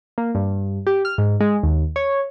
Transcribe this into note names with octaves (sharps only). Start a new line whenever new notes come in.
A#3
G2
G4
F6
G#2
G#3
D#2
C#5